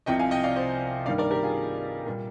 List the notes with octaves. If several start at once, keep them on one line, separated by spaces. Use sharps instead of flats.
C2 C3 F3 D#5 G5
F5 G#5
D#5 G5
D5 F5
C5 D#5
G2 D#3 G3 A#3 D5 F5
A#4 D5
G4 A#4
F4 G#4
A#2 G3 A#3